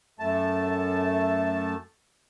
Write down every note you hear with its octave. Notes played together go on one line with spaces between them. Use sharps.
F#2 A3 A5